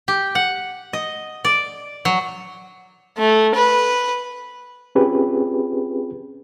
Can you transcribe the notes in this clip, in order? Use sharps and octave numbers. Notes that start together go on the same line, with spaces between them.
G4
F#5
D#5
D5
F#3
A3
B4
C4 C#4 F4 G4 G#4 B4